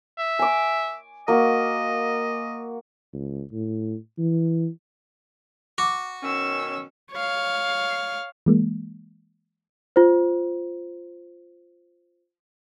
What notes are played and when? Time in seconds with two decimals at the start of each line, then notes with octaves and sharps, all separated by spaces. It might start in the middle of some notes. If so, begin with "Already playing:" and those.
0.19 E5
0.39 G#5 D6
1.28 A#3 F#4 D#5
3.13 C#2
3.53 A2
4.18 E3
5.78 F#4 D6
6.23 B2 D#3 C#4 C#6 E6
7.13 C#5 F5
8.46 E3 G#3 A#3
9.96 F4 C5